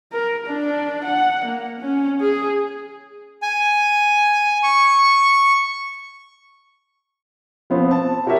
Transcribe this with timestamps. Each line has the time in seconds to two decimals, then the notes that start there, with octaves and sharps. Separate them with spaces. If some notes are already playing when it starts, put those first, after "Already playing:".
0.13 A#4
0.47 D4
1.05 F#5
1.45 A#3
1.80 C#4
2.21 G#4
3.42 G#5
4.63 C#6
7.70 F3 B3 C4
7.91 A5
8.26 F#4 G4 A#4 C#5 E5